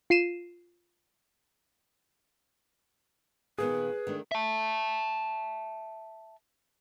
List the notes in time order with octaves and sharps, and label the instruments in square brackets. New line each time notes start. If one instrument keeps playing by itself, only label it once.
[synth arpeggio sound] F4 C7 D#7 E7
[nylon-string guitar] A#2 D#3 B3 [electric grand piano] G#4 [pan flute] B4
[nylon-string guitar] D#3 A3 D4
[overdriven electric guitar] E5 A5